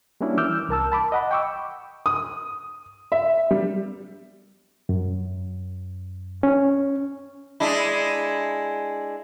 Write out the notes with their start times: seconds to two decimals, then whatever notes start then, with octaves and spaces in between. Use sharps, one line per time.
0.21 G3 A#3 C#4 D4 E4 F#4
0.37 E3 D6 E6 F6 G6
0.69 C2 A#4 A5 E6
0.92 A5 B5 D6
1.12 D#5 F#5 B5
1.31 G5 C#6 D6 E6
2.06 D#6
3.12 E5
3.51 G3
4.89 F#2
6.43 C#4
7.60 G#3 D4 E4